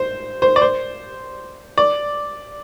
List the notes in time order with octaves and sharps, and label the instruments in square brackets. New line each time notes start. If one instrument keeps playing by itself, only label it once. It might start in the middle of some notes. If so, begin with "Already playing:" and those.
Already playing: [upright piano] C5
C5
D5
C5
D5